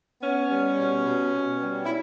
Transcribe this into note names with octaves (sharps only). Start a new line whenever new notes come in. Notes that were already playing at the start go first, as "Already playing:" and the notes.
B3 C#4
G3
B2
B2
B2
G3
E4